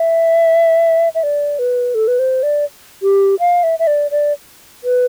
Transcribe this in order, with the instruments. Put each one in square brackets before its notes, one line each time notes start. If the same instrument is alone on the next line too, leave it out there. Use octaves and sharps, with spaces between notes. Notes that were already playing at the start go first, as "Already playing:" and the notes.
Already playing: [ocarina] E5
E5
D5
B4
A4
B4
C5
D5
G4
F5
E5
E5
D5
D5
B4